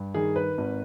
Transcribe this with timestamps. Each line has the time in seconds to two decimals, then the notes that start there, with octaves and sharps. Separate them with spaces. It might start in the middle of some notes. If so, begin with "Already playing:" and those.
Already playing: G2
0.14 D#3 G#4
0.36 B4
0.58 G#1